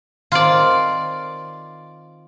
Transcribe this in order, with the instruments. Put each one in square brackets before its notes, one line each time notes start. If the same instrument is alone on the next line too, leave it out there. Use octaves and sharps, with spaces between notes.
[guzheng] D#3 C4 A4 [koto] F4 D5